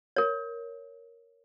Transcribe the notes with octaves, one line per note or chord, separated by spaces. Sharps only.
A#4 C#5